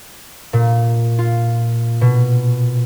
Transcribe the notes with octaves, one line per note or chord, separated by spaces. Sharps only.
A#2
F4
B2